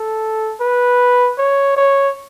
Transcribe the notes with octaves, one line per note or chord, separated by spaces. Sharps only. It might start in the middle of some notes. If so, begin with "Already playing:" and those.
Already playing: A4
B4
C#5
C#5